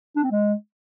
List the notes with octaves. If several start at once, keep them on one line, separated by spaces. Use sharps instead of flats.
D4
C4
G#3